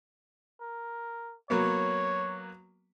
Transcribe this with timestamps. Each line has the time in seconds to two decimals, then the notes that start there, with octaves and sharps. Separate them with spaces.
0.61 A#4
1.50 F#3 A#3 B3 C#5